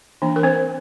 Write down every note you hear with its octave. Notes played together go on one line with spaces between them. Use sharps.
E3 A#3 D4
A#4
C4 C5